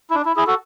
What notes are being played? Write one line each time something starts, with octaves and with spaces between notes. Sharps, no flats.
E4
D4
E4
E4 G#4
F#4 A4